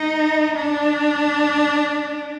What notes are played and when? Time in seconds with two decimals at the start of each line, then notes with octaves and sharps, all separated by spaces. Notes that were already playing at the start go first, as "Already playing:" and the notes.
Already playing: D#4
0.56 D4